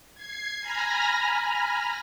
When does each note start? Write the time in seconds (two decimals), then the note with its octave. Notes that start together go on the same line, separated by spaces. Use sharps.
0.14 G#6 C7
0.61 G#5 A#5 B5 F6 A#6